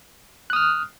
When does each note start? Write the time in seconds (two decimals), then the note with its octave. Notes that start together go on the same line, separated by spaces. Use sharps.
0.50 F#6
0.53 D#6
0.56 F6